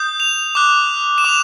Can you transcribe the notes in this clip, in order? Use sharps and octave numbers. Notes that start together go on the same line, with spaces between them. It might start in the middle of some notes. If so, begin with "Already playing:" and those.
Already playing: D#6 G6
F7
D6 F#6
E7
D6 F7